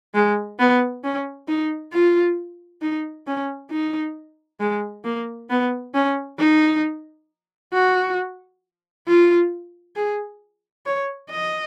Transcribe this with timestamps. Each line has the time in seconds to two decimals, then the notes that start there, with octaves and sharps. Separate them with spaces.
0.15 G#3
0.59 B3
1.04 C#4
1.48 D#4
1.93 F4
2.82 D#4
3.27 C#4
3.71 D#4
4.60 G#3
5.05 A#3
5.50 B3
5.94 C#4
6.39 D#4
7.73 F#4
9.07 F4
9.96 G#4
10.86 C#5
11.31 D#5